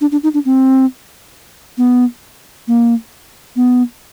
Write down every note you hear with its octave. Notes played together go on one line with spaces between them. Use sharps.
D4
D4
D#4
D4
C4
B3
A#3
B3